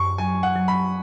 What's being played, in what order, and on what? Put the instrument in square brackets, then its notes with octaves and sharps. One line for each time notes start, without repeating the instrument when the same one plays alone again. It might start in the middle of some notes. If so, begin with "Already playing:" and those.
Already playing: [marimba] F#2 [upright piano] C#6
[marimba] F#3 [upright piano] G#5
[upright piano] F#5
[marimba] F#3
[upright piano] B5